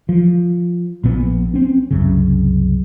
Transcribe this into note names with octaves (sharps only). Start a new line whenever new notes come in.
F3
A#1 A#2 B3
C4 C#4
C2 F#2 C#3